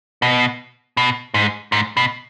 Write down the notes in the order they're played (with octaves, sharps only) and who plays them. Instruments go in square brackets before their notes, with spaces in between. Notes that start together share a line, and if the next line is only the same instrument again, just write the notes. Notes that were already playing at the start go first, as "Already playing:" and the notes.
[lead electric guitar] B2
B2
G#2
G#2
B2